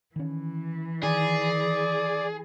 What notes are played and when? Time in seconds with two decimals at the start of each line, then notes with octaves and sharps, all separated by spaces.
0.16 D#3 E3 C#4
1.03 D#3 G#4 D5